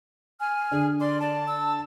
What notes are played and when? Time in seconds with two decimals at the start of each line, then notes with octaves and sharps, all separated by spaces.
0.39 G#5 F6
0.71 D3 G#4
1.00 D5 C6 D6
1.19 D5 A5
1.47 E6